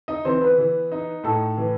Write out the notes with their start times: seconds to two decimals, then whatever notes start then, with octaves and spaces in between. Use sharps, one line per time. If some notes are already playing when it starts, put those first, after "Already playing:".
0.08 D#4 D#5
0.25 E3 C4 C5
0.41 B3 B4
0.58 E3
0.92 D#4
1.24 A2 A4
1.57 E3